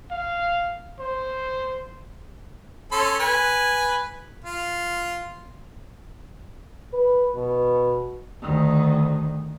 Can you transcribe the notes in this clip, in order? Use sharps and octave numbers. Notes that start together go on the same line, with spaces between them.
F5
C5
C#4 A4 C6
B4 G#5
F4
B4
B2
D2 D#3